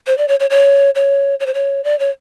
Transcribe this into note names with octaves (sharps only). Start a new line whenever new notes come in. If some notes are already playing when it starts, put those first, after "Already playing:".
C5
D5
C#5
C#5
C#5
C#5
C#5
C5
C#5
D5
C#5